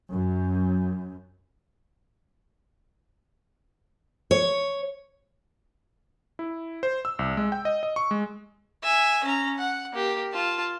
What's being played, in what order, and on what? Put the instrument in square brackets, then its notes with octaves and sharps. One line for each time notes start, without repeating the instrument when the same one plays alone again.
[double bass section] F#2
[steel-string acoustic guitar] C#5
[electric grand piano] E4
C5
E6
C2
G#3
G5
D#5
D#5
C#6
G#3
[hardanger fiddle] E5 G#5
C#4 A#5
F#5
A#3 G4
F4 A5